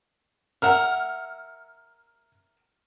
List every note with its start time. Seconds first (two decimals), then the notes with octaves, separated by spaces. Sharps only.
0.62 A#4 E5 F#5 F6